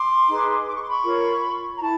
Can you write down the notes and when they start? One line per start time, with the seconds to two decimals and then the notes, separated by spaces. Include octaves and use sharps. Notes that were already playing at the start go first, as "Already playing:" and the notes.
Already playing: C6 D6
0.28 D#4 G#4 B4
0.67 D6
0.74 C#6
0.82 C6
0.89 B5 C#6
1.05 F4 A#4 C#5
1.75 A#5
1.81 E4 A5 B5